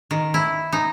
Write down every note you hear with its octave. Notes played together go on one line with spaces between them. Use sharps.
D#3
E4
D#4